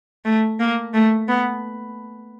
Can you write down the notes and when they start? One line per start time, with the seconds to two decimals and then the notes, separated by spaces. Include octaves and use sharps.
0.25 A3
0.60 A#3
0.94 A3
1.28 B3